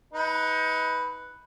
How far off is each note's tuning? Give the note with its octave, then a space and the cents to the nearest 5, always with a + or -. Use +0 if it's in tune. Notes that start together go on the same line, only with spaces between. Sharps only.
D#4 +30 B4 +0